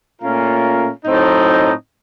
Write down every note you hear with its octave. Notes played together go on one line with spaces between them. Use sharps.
A#2 A3 C#4 F4 A#4
A2 F#3 C4 D#4